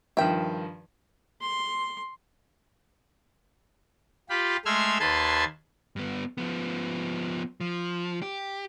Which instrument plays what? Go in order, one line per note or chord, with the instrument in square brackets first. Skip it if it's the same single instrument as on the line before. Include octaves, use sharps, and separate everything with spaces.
[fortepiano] G2 D#3 F3 [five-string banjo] E5 G5
[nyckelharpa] C6
[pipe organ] F4 G4 B5
G#3 A3 C6 E6 F6 G#6
D#2 B4 A5 C6 G#6
[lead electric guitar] G2 B3
F3 B3
F3
G4